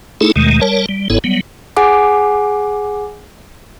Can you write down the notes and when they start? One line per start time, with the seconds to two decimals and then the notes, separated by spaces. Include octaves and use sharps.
0.21 A3 D#4 E4 G#4 A4
0.36 D#2 B2 D#3 G#3 A3
0.61 G3 A#4 C#5 A5
0.89 G3
1.10 G1 G#2 B3 E4 A4 C#5
1.24 F#3 G3 B3
1.77 G#4 F#5 G#5 D6